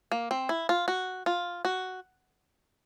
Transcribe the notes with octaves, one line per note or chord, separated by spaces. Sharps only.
A#3
C4
E4
F4
F#4
F4
F#4